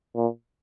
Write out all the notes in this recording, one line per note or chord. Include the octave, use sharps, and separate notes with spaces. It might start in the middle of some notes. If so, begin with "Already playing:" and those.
A#2